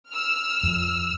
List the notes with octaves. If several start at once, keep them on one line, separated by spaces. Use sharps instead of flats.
E6 F6
F2 F3